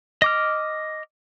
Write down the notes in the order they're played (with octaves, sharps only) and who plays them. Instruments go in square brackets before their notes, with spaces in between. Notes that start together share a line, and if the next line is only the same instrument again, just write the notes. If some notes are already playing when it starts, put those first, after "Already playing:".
[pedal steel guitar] D#5 D6 F6